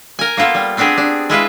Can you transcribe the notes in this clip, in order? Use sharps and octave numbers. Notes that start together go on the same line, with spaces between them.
A#4 G#5
A#3 B3 F4 A4
G3
B3 C4 D4 G4 G#4
D4
G#3 E4 F4 B4